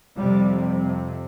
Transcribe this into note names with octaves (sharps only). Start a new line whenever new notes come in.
F2 C3 G3